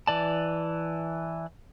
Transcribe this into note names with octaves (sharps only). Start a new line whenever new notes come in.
E3 D5 A5